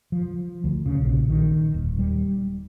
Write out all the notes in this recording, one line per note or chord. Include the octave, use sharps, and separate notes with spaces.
F3
D2
C#3
A#1
D#3
D#1
G3